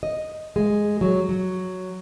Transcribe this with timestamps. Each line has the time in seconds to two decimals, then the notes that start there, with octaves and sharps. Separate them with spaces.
0.03 D#5
0.56 G#3
1.01 F#3
1.29 F#3